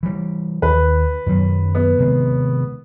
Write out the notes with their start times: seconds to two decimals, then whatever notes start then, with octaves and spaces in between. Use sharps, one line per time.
0.03 E3 G3
0.62 D#2 B4
1.26 F#2 D#3 F#3
1.75 B3
1.98 C3 D#3 G#3